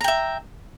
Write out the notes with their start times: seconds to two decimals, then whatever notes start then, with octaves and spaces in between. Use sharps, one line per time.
0.01 A#5
0.04 G5
0.08 E5